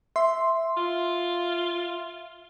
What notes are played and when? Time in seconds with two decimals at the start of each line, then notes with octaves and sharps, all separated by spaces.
0.16 E5 C6
0.77 F4